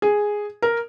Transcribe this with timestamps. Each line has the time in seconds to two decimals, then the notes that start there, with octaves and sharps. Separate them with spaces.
0.02 G#4
0.62 A#4